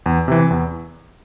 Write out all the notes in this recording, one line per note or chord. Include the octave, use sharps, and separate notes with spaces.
E2
C3 E3
E2